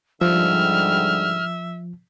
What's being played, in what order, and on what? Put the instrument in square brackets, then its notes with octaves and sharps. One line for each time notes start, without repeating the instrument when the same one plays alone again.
[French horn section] G#2 D3 G3 [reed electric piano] F3 [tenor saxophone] E5 [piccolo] F6